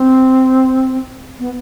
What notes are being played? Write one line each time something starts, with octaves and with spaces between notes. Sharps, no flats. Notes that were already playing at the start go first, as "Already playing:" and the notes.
Already playing: C4
B3